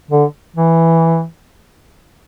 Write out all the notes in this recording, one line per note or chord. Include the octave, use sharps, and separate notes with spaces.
D3
E3